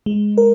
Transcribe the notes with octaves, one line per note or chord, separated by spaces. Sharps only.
G#3
A#4